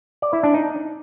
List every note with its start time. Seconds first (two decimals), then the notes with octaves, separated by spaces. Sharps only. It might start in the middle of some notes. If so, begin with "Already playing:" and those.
0.22 D5
0.33 E4
0.43 D4
0.54 D#4